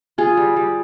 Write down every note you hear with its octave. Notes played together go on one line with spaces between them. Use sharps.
F4 G#4
G3
G3